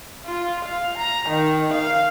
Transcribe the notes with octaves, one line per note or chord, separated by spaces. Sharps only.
F4
F5
A#5
D#3
F5